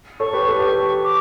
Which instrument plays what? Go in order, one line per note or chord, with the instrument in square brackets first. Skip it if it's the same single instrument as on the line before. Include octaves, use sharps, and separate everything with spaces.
[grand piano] A4 C#5 [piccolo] C#6
[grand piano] G4 B4
A4
G4
A4
[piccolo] D6